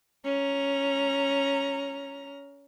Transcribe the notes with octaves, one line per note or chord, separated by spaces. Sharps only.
C#4 A#5